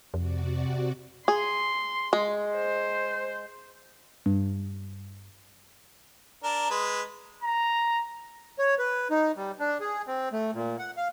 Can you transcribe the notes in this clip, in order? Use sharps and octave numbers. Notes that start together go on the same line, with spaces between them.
F2 C3 F#4 D5
G#4 C6
G#3
C5
G2
D4 A#4
G#3 B4
A#5
C#5
B4
D#4
G3
D4
G#4
C4
A3
A#2
F#5
F5